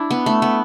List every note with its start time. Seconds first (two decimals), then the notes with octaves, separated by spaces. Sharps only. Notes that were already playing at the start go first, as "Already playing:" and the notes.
Already playing: D4 E4
0.11 B3
0.26 A3
0.42 B3